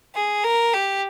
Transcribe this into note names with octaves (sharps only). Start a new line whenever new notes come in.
G#4
A#4
G4